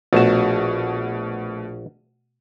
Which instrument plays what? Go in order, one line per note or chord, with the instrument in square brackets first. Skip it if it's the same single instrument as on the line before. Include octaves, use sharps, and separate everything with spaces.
[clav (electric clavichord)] A#1 A5 [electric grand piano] B2 A3 F#4